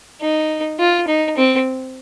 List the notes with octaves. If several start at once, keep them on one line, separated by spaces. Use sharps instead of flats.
D#4
F4
D#4
C4